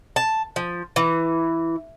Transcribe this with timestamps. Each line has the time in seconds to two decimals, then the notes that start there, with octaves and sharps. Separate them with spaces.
0.16 A5
0.56 F3
0.96 E3